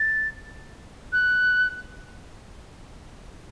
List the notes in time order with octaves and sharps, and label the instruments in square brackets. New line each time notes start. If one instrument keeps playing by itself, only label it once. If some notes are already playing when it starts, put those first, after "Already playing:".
Already playing: [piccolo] A6
F#6